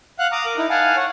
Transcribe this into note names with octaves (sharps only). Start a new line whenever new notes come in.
F5 F#5 F#6
A#5 D6 D#6
A#4 D6
D#4 E4
F5 F#5 G#5 A5
C#5 F#5